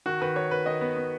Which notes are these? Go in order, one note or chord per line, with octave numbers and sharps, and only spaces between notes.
D#3 F#4
D#3 B4
D#3 C#5
D#3 B4
D#3 D#5
B3
B3